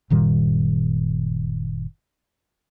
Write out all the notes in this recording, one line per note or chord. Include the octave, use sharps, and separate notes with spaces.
F#1 A#2 D#3 G3